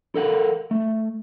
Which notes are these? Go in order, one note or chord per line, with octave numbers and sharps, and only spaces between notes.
A4 A#4 F5 F#5
A3